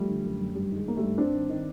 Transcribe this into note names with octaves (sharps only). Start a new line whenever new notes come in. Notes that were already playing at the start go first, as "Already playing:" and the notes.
Already playing: F3 G3 A3
D3
F#2
F#2
G2 G3
D#3
G#3
D#3 A#3
G3 A3
G2
G2 C4 D4
D#3
D#3